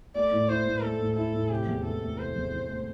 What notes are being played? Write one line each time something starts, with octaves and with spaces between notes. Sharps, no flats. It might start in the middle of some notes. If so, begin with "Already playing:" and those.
A3 D5
A2
E4 C5
A2
A3 A4
A2
E4 A4
A2
C3 G4
E2
E3 A4
A3
C3 C5
E2
E3
A3